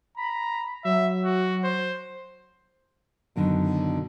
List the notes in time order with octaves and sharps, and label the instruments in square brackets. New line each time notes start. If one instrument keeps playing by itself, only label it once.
[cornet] A#5 [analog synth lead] B5
[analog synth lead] F#3 [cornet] E5
[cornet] F#4
C5
[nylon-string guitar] F#2 B2 D3 D#3